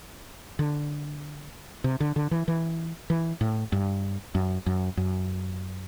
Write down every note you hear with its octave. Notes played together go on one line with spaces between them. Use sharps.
D3
C3
D3
D3
E3
E3
E3
A2
G2
F#2
F#2
F#2